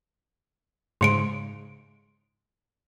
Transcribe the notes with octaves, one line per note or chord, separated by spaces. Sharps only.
G#2 C#3 G#3 C6 C#7 D7